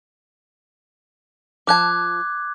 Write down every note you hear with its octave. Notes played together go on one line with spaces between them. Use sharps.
F3 A5 D6 F#6 G#6